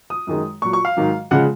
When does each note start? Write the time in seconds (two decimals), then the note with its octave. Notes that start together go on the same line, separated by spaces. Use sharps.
0.10 D#6
0.27 F#2 D#3 G#3
0.62 A#2 F#3 C#6
0.73 C#6
0.85 F5
0.97 G#2 D#3 F#3
1.31 C#3 F3 G#3 F#5